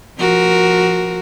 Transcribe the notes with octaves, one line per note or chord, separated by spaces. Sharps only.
F3 F#4 A#4